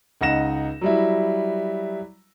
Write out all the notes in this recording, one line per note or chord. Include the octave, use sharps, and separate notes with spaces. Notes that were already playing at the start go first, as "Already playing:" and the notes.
C#2 D#4 F#5 A#6 E7
F#3 G3 E4